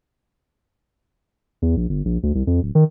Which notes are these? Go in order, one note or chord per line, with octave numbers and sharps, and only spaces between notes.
E2
A#1
G1
A#1
D2
C2
F2
D1
D#3